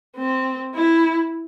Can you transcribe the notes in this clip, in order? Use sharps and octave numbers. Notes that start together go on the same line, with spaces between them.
C4
E4